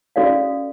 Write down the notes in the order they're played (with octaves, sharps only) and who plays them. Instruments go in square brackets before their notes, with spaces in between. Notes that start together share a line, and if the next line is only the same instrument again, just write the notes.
[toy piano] C#4 F#4 A4 D5 F5